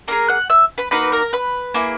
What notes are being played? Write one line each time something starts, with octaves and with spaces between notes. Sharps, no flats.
A#3 E4 G#4 A#4 A#5
F#5 F#6
E5 E6
B4 B5
A#3 D#4 F#4 B4 B5
A#4 A#5
B4 B5
A#3 E4 G#4